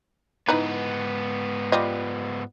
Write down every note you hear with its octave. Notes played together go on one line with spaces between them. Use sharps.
G#2 E3 B3 D#4 B4
G3 F4 D#5